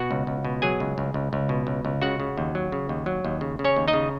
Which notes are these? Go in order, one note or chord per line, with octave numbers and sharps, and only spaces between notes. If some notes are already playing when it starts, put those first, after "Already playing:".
Already playing: B2 F#4 F#5
C#2
C#2
B2
F#3 G#4 G#5
C#2
C#2
C#2
C#2
B2
C#2
C#2
C#3 F#4 F#5
C#3
D#2
F#3
C#3
D#2
F#3
D#2
C#3
C#3
C#4 C#5
D#2
D#4 D#5
C#3